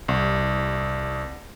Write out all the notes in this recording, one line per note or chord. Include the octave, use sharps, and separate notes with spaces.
C2